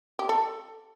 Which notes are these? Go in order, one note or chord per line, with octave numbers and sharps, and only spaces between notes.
G4
A4